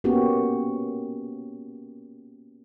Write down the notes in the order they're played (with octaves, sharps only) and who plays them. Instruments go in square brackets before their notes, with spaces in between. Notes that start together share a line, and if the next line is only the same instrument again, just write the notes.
[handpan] A#3 B3 C#4 F#4 G4